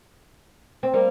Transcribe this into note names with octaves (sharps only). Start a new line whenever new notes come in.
C4
G3 A#3